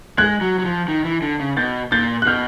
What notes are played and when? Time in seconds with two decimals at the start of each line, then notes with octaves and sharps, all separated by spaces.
0.18 G#3 F#6 G#6
0.41 F#3
0.59 F#3
0.65 F3
0.88 D#3
1.05 E3
1.22 D3
1.40 C#3
1.57 B2 G6 A6
1.92 A#2 G6 A6
2.22 F#6
2.26 B2 F6 G6